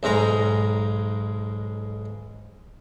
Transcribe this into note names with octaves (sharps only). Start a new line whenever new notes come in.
B1 G#2 G#3 A#5